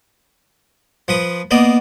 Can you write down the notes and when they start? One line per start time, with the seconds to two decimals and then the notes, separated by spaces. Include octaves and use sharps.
1.08 F3 B4 D#6
1.51 A#3 B3 D5 D#5